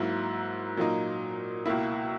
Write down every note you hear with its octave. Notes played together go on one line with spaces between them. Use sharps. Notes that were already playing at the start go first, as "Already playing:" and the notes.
Already playing: G#2 F#3 A#3 E4
A#2 F#3 A#3 D#4
C#2 B2 A#3 E4